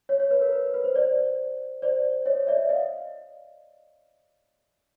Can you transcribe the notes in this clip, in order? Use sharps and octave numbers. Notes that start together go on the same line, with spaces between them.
C#5
C#5
B4
A#4
B4
B4
C5
C5 D5
C5 D5
C#5 D#5
D5 E5
D#5 F5